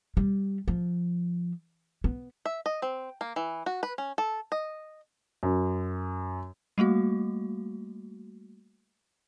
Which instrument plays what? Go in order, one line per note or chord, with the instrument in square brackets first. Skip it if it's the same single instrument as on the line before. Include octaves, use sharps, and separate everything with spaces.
[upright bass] G3
F3
B3
[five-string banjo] E5
D#5
C4
A#3
E3
F#4
B4
C#4
A4
D#5
[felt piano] F#2
[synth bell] G3 A3 A#3 F#4